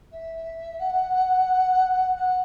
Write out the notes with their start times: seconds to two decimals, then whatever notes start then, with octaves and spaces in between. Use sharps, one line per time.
0.11 E5
0.79 F#5
2.15 F#5